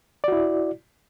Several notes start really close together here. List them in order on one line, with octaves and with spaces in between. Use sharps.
D5 F#4 E4